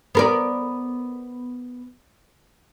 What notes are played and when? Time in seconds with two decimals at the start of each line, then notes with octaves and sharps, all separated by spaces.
0.15 B3 A#4 D5